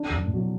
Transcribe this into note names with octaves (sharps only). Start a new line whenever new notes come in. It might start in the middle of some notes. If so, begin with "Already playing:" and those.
Already playing: D4
E2
F#2
A2
B2 F#3